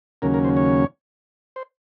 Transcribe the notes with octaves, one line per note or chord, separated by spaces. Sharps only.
D#2 C#3 F#3 A#3 C#4 A#4
A#4
C5
C#5
C5